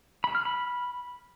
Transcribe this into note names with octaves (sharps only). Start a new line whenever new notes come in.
B5
F6
B5